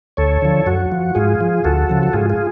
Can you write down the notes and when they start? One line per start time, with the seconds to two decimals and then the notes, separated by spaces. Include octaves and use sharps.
0.17 D2 A4 C#5
0.42 D3 F3
0.66 F#2 F#4
0.92 F3
1.15 G#2 F4 G#4
1.41 F3
1.64 D2 F#4 A4
1.89 C#3 F3
2.03 F#4
2.13 G#2 F4 G#4
2.30 F4 G#4